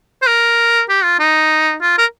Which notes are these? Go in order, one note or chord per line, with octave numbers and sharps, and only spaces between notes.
C5
A#4
G4
F4
D#4
F4
A#4